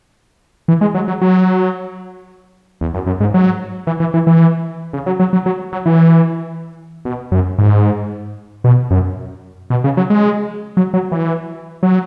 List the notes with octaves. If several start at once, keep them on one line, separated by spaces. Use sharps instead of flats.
E3
G#3
F#3
F#3
F#3
E2
F#2
F#2
G#2
F#3
E3
E3
E3
E3
C#3
F#3
F#3
F#3
F#3
F#3
E3
B2
F#2
G#2
B2
F#2
B2
C#3
F#3
G#3
F#3
F#3
E3
F#3